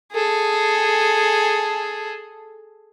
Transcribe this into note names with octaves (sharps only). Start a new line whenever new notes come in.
G#4 A4